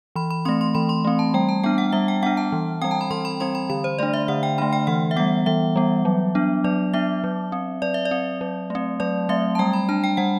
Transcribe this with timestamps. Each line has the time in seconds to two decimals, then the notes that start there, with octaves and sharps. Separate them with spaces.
0.16 E3 B5
0.30 B5
0.45 A3 C4 C6
0.61 C6
0.75 E3 B5
0.89 C6
1.05 A3 C4
1.19 A5
1.34 G3 G5
1.49 A5
1.63 B3 D4 G5
1.78 F#5
1.93 G3 E5
2.08 G5
2.23 B3 D4 F#5
2.37 A5
2.52 E3
2.82 G3 C4 G5
2.91 A5
3.01 B5
3.11 E3 C6
3.25 B5
3.40 G3 C4 C6
3.55 B5
3.70 D3 B5
3.84 C5
3.98 A3 D4 D5
4.13 E5
4.28 D3 F#5
4.43 G5
4.58 A3 D4 B5
4.73 G5
4.87 E3 F#5
5.11 E5
5.16 G3 B3 F#5
5.46 E3 E5
5.76 G3 B3
6.05 F#3
6.35 B3 D4
6.64 F#3 D5
6.94 B3 D4 E5
7.24 F#3
7.52 C4
7.82 F#3 D5
7.94 E5
8.05 D5
8.11 C4
8.41 F#3
8.70 A3 C4
9.00 F#3 D5
9.29 A3 C4 E5
9.55 A5
9.59 G3 G5
9.73 B5
9.89 D4 A5
10.04 G5
10.17 G3 F#5